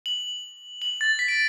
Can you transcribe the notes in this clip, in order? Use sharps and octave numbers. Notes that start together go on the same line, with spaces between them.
F#7
F#7
A6
B6
D7